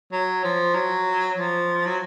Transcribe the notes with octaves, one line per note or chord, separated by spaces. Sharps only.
F#3
F3
F#3
F3
F#3